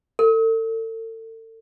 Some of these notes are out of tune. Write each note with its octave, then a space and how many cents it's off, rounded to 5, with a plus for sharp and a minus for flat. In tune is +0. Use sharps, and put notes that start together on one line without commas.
A4 +40